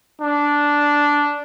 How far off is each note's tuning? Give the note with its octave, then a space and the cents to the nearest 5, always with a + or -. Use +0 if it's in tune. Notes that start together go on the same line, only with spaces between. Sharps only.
D4 -10